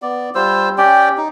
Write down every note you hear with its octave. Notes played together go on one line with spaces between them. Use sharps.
B3 D5
G3 F4 C5 E6
C#4 G4 D5 G5
D#4